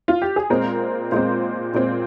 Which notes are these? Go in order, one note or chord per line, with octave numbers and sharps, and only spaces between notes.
F4
G4
G#4
A#2 G#3 C4 A#4
A#2 G#3 C4 C5
A#2 G#3 C4